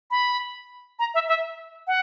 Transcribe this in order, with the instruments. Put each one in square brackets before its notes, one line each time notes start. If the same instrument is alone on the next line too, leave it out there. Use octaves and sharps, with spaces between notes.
[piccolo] B5
A#5
E5
E5
F#5